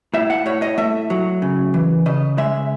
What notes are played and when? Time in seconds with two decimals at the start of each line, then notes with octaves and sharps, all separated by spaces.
0.14 A2 E5
0.30 F#5
0.46 A2 C#5
0.62 D#5
0.78 A3 E5
1.10 F#3
1.42 C#3
1.74 E3
2.06 C#3 D#5
2.38 G#3 E5